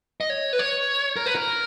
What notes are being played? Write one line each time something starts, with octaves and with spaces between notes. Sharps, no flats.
D#5
C#5
B4
C#5
A#4
B4
A#4